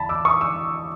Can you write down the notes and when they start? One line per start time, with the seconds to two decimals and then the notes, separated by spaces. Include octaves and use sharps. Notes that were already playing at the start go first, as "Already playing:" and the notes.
Already playing: E2 A5 B5
0.09 D6 E6
0.25 C#6 D#6
0.41 D6 E6